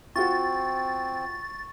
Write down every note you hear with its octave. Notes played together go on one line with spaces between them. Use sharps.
C4 F4 F#4 C#6 A6